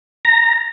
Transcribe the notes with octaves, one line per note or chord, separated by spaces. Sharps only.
A#5